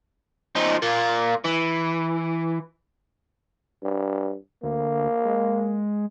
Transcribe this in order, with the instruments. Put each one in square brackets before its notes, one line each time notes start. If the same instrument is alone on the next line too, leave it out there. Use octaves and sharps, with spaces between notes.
[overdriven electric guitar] F3 D#4
A#3 F4
E3
[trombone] G2
[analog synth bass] D2 [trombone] A#3
[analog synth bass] G#3